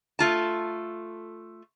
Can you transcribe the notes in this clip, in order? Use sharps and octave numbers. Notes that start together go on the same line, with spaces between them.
A3 F4 A5